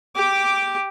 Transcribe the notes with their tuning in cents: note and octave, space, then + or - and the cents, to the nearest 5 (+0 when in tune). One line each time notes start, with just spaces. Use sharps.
G4 +0 D6 +0